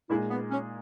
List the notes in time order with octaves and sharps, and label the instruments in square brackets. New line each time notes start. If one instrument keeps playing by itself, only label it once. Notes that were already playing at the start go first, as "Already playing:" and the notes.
[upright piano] A#2 G#3 D#4 G#4 [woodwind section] E4
[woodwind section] B3
C#4